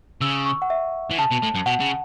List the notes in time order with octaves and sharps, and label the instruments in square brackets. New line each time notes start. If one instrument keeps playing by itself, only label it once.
[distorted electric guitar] C#3 [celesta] E6
[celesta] C#6
F#5
E5
[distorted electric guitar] E3
[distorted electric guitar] C#3 [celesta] A5
[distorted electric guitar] B2
A2
F#2
[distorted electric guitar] B2 [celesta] F#5
[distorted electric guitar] C#3